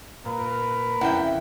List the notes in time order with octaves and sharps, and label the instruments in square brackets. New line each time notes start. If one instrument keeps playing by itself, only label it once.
[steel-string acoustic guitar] A#2 [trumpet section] A#4 B4
[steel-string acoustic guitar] F2 A2 C#3 [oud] E4 [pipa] F#5 G5